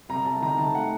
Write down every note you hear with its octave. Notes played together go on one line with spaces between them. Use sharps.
C2 A#5
C2 A5
D#3 A#5
D#3 A5
A3 F#5